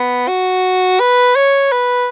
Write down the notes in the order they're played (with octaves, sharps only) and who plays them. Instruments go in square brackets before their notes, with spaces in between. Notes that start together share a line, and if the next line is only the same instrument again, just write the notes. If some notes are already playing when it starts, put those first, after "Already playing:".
Already playing: [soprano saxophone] B3
F#4
B4
C#5
B4